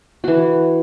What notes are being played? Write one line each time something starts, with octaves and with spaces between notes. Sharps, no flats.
E3 F#4